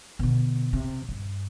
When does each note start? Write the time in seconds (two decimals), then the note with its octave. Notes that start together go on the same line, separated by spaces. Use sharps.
0.19 B2 D3
0.73 C3
1.09 G2